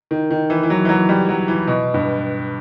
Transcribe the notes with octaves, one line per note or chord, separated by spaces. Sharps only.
D#3
D#3
E3
E3
F#3
E3
F#3
G3
F#3
E3
B2
G2